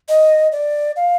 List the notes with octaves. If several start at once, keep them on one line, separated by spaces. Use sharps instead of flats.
D#5
D5
F5